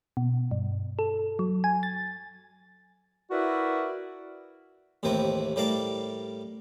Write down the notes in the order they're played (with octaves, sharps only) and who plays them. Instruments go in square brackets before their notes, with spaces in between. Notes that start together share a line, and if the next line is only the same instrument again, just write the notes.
[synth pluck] B2
G2
A4
F#3
G#5
A6
[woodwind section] E4 F#4 A#4 B4 D5 E5
[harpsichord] A1 D#2 C3 C4 A#4 B4
A2 G3 A#4 D5 F5 A5